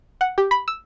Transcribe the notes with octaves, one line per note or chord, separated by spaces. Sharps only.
F#5
G4
B5
E6